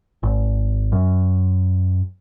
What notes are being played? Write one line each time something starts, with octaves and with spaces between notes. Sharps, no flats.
G#1
F#2